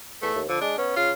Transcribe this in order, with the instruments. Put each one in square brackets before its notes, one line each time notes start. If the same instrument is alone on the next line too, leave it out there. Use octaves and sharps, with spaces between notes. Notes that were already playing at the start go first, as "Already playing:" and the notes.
[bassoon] E2 [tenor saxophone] A3
[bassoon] D#2
[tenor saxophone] D3 [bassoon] F3
[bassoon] G#3 [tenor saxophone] D4
[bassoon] B3 [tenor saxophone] C#4
[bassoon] C#3 [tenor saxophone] F4